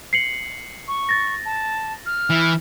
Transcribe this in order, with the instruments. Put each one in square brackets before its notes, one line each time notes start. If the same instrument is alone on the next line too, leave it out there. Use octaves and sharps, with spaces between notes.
[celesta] C7 C#7 F#7
[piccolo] C#6
[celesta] A6 A#6
[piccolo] A5
F6
[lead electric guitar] E3